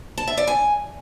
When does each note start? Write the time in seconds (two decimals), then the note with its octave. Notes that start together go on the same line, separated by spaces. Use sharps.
0.18 A5
0.27 E5
0.37 D5
0.47 G#5